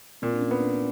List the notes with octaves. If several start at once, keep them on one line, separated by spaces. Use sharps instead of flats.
A#2 C4
D4
C#4
B3
D4